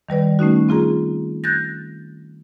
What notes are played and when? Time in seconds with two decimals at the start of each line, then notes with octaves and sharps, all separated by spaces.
0.09 D#3 G3 B4 D5
0.39 A3 C#4 D#4 F#4
0.69 C4 F4 G#4 A#5
1.44 F#6 G6 A6 A#6